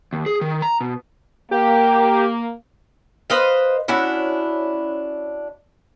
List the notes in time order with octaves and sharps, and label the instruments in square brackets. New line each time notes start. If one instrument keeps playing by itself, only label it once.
[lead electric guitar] D#2
G#4
D#3
A#5
B2
[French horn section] A#3 [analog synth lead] G4
[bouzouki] B4 C5 D#5 F5
C#4 D4 E4 F#4